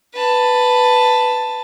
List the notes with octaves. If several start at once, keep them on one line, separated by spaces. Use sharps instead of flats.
B4 A5